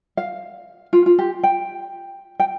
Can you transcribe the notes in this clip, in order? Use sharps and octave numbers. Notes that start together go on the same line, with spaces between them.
F5
F4
F4
G4
G5
G5